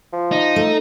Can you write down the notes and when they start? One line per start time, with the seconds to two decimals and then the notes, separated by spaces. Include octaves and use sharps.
0.13 F3
0.32 D#4
0.56 A3